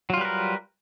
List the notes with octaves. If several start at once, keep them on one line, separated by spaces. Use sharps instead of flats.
F#3 G3 F4 A#4 B4